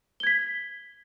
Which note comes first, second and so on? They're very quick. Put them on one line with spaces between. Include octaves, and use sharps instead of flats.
G7 G#6 B6